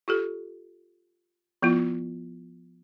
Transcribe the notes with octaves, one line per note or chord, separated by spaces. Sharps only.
F4 G4 A4
F3 B3 E4 F4